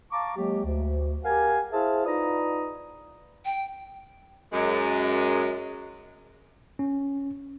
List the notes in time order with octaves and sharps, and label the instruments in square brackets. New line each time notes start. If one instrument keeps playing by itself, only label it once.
[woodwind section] F5 A5 A#5 C#6 D6
F#3 G#3 A#3 G4
D2
G4 A#4 F5 F#5 G#5
E4 G#4 C5 E5 F5 A5
D#4 F4 B4 D5 A#5 D#6
[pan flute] G5
[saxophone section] F#2 G#3
[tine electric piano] C#4